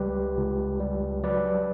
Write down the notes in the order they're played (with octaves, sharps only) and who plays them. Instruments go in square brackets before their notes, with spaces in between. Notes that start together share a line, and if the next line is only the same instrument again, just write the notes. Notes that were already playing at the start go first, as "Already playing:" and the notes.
Already playing: [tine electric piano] C#2 G3 G4 B4
C#2
G3
F#3 B4 D5